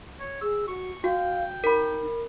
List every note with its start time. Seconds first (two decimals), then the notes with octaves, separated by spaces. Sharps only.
0.20 C#5
0.41 G#4 E6
0.67 F#4 C#6
1.04 F#4 F5 G5
1.64 D#4 A#4 B5